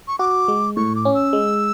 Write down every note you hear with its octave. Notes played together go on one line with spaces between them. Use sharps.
C#6
F#4 D6
G#3
A2 C#6
D6
C#4
E6
G#3